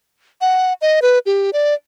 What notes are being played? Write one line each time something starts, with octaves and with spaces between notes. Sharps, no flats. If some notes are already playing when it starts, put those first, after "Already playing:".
F#5
D#5
B4
G4
D5